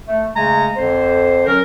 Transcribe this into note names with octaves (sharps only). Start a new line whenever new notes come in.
A3
C#3 G#3 A3 G#5 A#5
F2 D3 C5
F#3 C#4 A#4